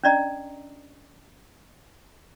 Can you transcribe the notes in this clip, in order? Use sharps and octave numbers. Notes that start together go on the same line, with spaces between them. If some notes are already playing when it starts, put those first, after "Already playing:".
C#4 D4 D5 D#5 A#5